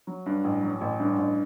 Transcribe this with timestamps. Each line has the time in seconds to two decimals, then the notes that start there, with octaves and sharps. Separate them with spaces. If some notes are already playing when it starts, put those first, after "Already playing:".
0.07 F#3
0.26 G2
0.44 A1
0.63 F#3
0.81 A1
1.00 G2
1.18 A1